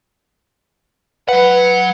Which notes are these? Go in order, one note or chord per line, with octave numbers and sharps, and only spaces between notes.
F#3 B4 F#5